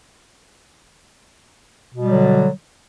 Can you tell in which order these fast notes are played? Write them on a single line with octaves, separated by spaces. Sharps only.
B2 G3 D3 F#3